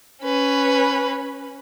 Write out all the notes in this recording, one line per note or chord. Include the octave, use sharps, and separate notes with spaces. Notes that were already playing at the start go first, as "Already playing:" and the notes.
C#4 B4